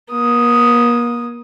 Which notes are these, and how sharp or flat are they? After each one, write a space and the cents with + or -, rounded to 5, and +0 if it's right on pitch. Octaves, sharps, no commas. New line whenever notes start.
A#3 +40 D#6 +0